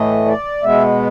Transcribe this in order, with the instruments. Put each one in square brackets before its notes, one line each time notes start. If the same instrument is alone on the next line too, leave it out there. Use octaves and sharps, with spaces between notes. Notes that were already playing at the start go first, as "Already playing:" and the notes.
Already playing: [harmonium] A2 E3 A3 D#5
D5
B2 G#3 B3 E5